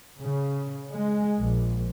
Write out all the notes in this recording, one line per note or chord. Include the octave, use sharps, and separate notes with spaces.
C#3
G#3
A#1